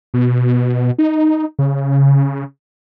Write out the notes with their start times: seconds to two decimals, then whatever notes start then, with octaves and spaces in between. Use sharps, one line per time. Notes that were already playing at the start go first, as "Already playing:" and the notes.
0.14 B2
0.98 D#4
1.59 C#3